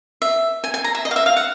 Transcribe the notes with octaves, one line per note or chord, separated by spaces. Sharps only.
E5
G#5
G#5
A#5
E5
D#5
F5
E5
F5
F#5